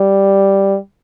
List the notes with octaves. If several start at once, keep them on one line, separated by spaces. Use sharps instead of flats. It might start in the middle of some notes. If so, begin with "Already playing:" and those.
Already playing: G3